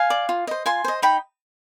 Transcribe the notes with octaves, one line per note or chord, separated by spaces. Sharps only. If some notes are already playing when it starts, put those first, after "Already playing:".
Already playing: F5 G#5
D5
F4
C5 D#5
F4 G#5 C6
C5 D#5
D#4 G5 B5